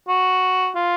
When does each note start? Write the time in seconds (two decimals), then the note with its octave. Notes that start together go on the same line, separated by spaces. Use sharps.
0.08 F#4
0.76 F4